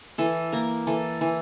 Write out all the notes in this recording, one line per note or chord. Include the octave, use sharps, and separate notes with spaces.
E3 A4
A#3 A#4
E3 A4
E3